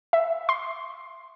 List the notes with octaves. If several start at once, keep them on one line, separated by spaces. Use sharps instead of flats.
E5
C6